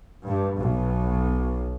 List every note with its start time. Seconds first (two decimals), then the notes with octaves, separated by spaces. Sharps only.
0.25 G2
0.58 B1